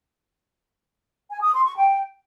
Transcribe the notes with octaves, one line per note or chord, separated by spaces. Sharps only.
G#5
D#6
C6
C#6
G5